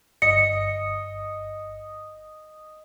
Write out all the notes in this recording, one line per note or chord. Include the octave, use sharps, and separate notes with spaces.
G1 D#5 C#7